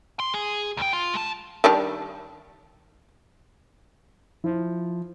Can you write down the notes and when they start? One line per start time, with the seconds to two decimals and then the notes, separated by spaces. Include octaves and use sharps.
0.20 C6
0.34 G#4
0.77 D2 G5
0.93 F4
1.14 G#3 A5
1.64 D#3 G3 D4
4.44 F3 E4